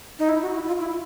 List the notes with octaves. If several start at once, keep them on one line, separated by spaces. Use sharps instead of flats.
D#4
E4
F#4
E4
F4
E4